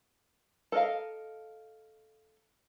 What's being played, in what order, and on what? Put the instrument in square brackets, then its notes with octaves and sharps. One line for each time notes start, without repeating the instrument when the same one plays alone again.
[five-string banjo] A4 A#4 D#5 F5